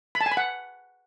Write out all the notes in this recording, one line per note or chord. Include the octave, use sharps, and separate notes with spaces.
B5
A5
G#5
B5
F#5